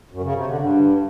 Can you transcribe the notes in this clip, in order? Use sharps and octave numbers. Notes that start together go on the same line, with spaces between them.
F#2
C#3
C3
D3
G2